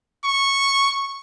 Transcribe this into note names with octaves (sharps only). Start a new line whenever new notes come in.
C#6